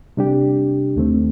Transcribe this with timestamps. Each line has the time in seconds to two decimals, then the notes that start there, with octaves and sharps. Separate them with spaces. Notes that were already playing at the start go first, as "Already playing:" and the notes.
0.17 C3 G3 D4 G4
0.96 D#2 D#3 A3 C4